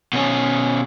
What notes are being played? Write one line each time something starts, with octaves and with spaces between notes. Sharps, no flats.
B2 C#4